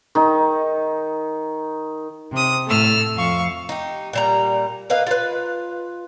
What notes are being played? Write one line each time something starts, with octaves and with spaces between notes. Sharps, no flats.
D#3 D#4
C3 D#6
A2 A3 E6 F6
F2 F5 C#6
D#4 G4
A#2 G3 A#5
A#3 B4 D#5 F5
F4 B4